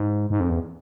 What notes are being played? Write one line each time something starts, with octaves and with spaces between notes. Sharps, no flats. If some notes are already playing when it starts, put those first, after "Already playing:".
Already playing: G#2
G#2
F2
E2